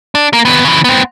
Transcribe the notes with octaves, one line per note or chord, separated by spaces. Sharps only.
D4
A#3
D#2 B3
C#3 E3
B3 C4